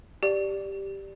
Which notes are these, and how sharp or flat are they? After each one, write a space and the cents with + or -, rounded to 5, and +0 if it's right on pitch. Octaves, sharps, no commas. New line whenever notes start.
G4 +0 D5 +0